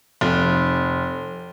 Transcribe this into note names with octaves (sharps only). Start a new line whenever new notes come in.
F1